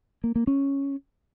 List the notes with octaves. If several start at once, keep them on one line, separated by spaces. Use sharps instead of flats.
A#3
A#3
C#4